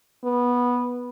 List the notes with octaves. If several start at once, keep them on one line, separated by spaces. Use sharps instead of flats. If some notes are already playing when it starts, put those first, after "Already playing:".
B3